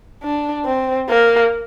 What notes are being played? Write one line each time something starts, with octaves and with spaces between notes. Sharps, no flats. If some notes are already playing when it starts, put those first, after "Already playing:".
D4
C4
A#3